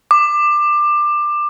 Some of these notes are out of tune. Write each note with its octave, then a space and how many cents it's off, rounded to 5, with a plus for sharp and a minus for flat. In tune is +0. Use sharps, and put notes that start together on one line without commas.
D6 +20